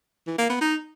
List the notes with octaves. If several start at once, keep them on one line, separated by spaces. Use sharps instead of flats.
E3
A#3
B3
D#4